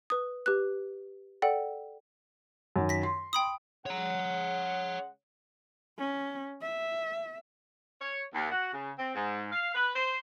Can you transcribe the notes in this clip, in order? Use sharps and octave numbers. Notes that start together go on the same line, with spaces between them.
B4 D#6
G4 B4 F#6
A4 D5 F#5 G5
F#2 D#3
A#6 B6
C6
G5 B5 D#6
C#3 G#3 C#5 F#5 A#5
C#4
E5
C#5
D#2
F#4
C#3
C4
G#2
F5
B4
C5